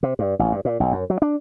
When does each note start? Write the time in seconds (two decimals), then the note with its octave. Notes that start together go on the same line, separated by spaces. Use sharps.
0.03 C3
0.19 G2
0.39 A1
0.52 G2
0.65 A#2
0.80 B1
0.92 F#2
1.10 F#3
1.22 D4